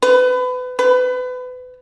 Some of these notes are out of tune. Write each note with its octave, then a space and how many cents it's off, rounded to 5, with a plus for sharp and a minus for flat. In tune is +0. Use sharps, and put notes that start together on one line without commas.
B4 +30
B4 +30